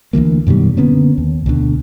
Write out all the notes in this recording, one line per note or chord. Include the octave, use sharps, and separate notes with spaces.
D2 E3 F3 A#3
F#2 B2 D#3 G3
D3 A#3 B3 C#4
D#2
D2 B2 D3